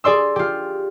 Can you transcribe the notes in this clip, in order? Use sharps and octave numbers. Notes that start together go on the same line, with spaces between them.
G#4 D5 C6 E6
F4 G4